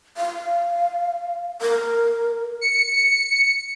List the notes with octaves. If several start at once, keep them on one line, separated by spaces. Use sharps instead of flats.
F5
A#4
C#7